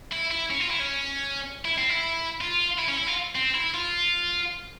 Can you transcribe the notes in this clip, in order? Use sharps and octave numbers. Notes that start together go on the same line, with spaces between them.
E4
E4
C#4
F4
E4
C#4
E4
C4
E4
F4
E4
C#4
E4
F4
C4
E4
F4